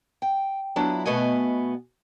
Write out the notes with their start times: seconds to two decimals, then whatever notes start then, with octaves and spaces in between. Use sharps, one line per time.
0.22 G5
0.76 F#3 B3 D4 E4 F4
1.06 B2 A3 B3 F#4 D#5 G#5